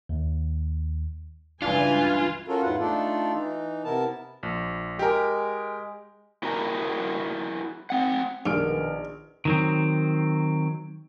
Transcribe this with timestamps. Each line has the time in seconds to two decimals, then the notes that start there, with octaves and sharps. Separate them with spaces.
0.09 D#2
1.62 C#2 G2 E3 D4 F4 B4 G#5
2.48 C#4 F4 F#4 A4 A#4
2.62 E2 G#2 E4 F4 B4 F#5
2.80 A3 D4 D#4 F4 A4 D5
3.33 E3 D#4
3.85 C3 B3 E4 A#4 A5
4.43 A#1
4.99 G#3 G4 A#4
6.43 E4 F#4 G#4 A#4 A#5
7.90 C4 F#5
8.46 A#1 G2 B2 D#3 F6 D7
9.45 D#3 F#3 C4